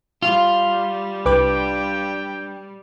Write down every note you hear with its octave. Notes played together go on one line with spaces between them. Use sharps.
G3 F4
C2 D4 B4 G5 D6